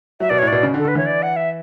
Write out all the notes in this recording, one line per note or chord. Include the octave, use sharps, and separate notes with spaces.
F#3 E5
B2 D5
A2 C#5
B2 D5
C#3
D3
A4
D3 B4
E3 C#5
D5
F#5
E5